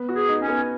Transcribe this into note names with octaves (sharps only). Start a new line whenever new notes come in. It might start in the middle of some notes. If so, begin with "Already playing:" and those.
Already playing: B3
F#4
G#4
D#4
C#4
B3